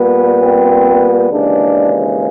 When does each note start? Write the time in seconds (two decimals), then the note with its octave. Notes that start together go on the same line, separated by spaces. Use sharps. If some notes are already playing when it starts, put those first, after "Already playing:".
Already playing: A#2 G3 B3
0.41 C4
1.29 D#2 C#3 E3 G#3 D4